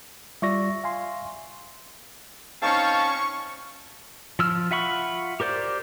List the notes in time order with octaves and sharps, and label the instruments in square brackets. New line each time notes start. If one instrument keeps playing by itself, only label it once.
[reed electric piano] G3 F4 D5 [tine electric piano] E5 C#6 A#6
[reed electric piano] F5 G#5 C6
[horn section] C4 D#4 A5 [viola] C#4 [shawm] F5 [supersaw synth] C#6
[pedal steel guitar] F3 E6 F6
F4 E5 F#5 B5 C#6
G4 A#4 C5 D5